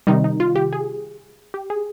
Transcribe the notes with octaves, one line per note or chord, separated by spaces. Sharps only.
C3 D#3 G3 D#4
D#4
F4
G4
G#4
G4
G#4